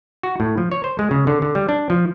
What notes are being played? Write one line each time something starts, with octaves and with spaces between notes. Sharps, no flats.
F#4
A2
F3
C#5
C5
G#3
C#3
D3
D3
G3
D4
F3